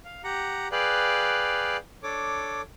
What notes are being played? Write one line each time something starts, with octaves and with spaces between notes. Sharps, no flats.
F5
G4 F#5 A#5
G#4 B4 D5 F5 G5 F#6
D4 A4 C#5 D6